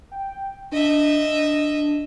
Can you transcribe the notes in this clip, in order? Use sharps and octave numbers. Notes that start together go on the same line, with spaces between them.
G5
D4 D#5 E5